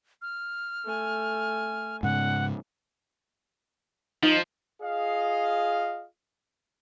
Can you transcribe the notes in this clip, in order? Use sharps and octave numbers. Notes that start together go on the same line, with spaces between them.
F6
A3 G#5
G#2 C#3 F#5
F3 D#4
F4 G#4 D#5 F5